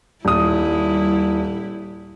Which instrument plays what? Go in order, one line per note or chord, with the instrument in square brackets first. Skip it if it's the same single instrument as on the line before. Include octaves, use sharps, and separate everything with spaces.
[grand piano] D#1 D#6 [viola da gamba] G3 E4